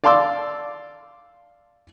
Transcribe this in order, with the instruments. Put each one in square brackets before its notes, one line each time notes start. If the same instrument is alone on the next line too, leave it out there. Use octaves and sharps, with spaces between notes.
[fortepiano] D5 F5 A5 C6 D6 E6